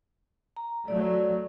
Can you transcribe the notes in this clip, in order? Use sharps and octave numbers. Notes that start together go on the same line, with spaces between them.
A#5
F#3 A3 D5